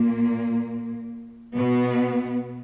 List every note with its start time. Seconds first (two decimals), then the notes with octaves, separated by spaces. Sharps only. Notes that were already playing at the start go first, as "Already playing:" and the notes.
Already playing: A#2 A#3
1.56 B2 B3